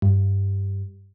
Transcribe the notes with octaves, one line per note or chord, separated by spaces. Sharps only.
G2